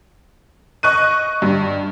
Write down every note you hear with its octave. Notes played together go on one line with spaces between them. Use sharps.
D#5 C#6 F#6 D#7
G2